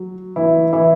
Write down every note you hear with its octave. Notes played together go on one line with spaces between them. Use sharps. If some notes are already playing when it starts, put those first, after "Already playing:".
Already playing: F#3
E3 E4
E3 E4